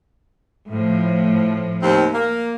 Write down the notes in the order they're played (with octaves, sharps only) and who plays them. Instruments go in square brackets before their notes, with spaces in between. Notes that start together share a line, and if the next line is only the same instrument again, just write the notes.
[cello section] A2 F3
[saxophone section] D#2 C4
A#3